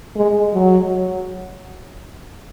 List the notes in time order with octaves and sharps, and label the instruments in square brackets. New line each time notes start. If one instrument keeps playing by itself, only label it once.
[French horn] G#3
F#3